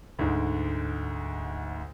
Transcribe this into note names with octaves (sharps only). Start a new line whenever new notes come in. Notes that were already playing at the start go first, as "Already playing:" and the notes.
D2 G#2